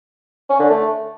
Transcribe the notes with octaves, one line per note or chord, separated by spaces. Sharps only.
C#4
D3
A3